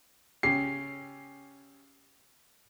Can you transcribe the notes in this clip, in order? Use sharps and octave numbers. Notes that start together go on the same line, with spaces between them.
C#3 C#4 G4 C7